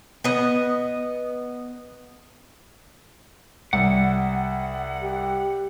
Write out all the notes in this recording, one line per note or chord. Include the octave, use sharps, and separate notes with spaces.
B3 D#5
C2 F#5
G4